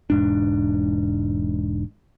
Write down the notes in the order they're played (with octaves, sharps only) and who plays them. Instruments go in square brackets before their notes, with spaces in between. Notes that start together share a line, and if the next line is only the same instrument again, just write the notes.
[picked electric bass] E1 G#2 D4